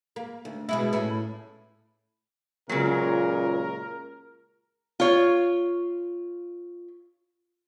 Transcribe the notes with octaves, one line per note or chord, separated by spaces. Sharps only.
A#3
D2
B2 G#3 E4
A2 C#4 E4
C#2 A#2 C#3 F#3 A#4
F4 C#5